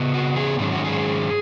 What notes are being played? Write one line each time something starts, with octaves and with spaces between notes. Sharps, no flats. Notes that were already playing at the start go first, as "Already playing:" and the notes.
Already playing: C#3 B3
F#4
G#4
G#2 D#3 F#3 C#4 G#4
F#4
G#4